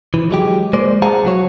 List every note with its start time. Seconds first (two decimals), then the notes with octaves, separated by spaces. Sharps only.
0.14 E3
0.31 F#3 G#3 G4
0.73 G#3 A#3 C5 D5
1.02 G#4 C5 F5 F#5 A5 A#5
1.23 C#2 F#3 F#4 C#5